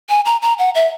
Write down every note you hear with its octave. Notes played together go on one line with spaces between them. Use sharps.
G#5
A#5
A#5
F#5
E5